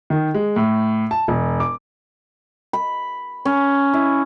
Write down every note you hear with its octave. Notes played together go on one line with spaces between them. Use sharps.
D#3
G#3
A2
A5
E1
D6
B5
C#4
E4